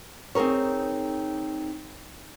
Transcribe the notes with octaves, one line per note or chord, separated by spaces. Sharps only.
C4 D#4 G#4 A#4 C#5